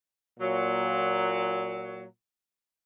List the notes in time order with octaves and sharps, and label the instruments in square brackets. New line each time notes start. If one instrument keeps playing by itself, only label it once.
[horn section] A#2 F#3